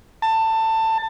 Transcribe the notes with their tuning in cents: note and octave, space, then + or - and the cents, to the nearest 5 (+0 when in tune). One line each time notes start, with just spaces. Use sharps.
A5 +20